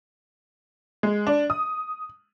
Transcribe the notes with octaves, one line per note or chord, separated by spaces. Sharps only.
G#3
D4
D#6